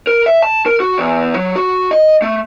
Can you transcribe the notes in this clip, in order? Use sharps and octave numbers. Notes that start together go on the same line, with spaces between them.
A#4
E5
A5
A#4
F#4
E2
F#3
F#4
D#5
A3